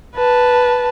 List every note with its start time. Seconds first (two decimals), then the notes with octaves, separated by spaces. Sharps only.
0.15 B4 A5